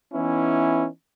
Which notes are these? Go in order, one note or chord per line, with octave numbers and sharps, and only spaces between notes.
E3 B3 C#4 D#4 E4